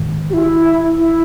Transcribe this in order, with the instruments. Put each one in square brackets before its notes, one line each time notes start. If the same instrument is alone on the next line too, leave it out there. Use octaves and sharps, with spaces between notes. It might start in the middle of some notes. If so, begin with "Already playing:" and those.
Already playing: [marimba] G#2 D#3 G#3
[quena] G4
E4
E4